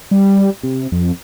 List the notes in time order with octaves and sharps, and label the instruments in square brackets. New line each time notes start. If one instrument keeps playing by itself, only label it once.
[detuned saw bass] G3
C3
F2